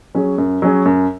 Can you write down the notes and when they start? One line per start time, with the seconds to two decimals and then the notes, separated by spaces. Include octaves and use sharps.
0.15 F#3 C#4 G#4
0.38 F#2
0.62 F#3 C#4 G#4
0.85 F#2